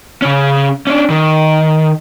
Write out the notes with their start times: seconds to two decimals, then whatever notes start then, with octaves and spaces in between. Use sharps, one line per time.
0.22 C#3 C#4
0.87 C#4 D4
1.10 D#3